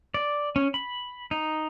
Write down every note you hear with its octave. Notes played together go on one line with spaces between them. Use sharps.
D5
C#4
B5
D#4